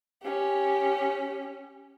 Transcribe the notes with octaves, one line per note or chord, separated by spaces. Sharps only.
C#4 G4